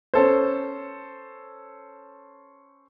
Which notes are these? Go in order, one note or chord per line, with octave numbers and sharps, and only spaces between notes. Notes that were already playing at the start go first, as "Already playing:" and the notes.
C#4 A4 C5